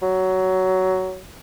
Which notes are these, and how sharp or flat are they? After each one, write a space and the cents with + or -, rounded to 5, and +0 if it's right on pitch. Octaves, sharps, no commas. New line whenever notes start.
F#3 +15